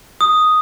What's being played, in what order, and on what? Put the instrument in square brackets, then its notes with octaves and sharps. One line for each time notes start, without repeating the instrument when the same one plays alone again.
[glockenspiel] D#6